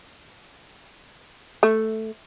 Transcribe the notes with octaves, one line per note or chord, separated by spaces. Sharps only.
A3